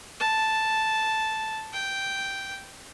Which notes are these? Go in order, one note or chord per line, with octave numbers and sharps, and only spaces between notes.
A5
G5